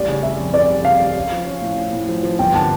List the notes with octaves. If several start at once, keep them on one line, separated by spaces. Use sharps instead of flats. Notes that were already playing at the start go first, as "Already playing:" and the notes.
Already playing: A1 G3 D5
C#3
G3 E5
F2
C#3 D5
G3
C#3 F5
G3
C#4
F3
C#4
A2
C#4
A2
F3
F3
G1 G5
D3 A5